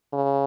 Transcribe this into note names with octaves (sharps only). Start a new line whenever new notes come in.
C#3